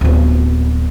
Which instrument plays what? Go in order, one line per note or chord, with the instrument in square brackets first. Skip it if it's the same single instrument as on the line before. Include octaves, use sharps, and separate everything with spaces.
[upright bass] D1 B3